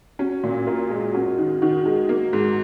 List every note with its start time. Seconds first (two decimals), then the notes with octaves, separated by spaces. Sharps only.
0.19 C#4 F#4
0.44 A#2
0.67 F4 A#4
0.90 G#3 G#4
1.14 C#4 F#4
1.38 D#3
1.62 D#3 F#4
1.86 G#3
2.09 A#3
2.33 G#2